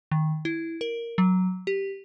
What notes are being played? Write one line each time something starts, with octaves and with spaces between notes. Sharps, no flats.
D#3
E4
A#4
F#3
G4